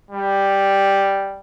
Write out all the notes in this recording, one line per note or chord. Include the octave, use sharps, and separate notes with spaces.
G3